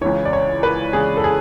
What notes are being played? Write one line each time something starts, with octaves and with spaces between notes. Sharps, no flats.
C#2 C#3 E3 C#5
D5
C#5
B4
C#2 C#3 E3 G#4
A4
G#4